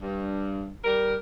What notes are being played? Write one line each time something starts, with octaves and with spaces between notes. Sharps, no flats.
G2
G3 A#4